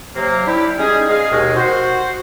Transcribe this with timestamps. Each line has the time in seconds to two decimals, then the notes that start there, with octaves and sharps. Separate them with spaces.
0.15 C3 F#3 A#3
0.47 D4 E4 G4
0.78 G3 G#3 C#4 D#4 G#4
1.10 G#3 G#4 F5
1.32 D#2 B2 G#3
1.56 F#4 C5